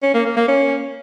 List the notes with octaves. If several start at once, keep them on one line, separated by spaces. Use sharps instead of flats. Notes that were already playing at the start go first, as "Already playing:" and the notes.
C#4
A#3
A#3
A#3
C#4